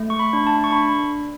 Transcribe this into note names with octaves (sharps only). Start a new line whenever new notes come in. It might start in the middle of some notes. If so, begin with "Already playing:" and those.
Already playing: A3
C#6
B5
D4
A5
C#6
D4 B5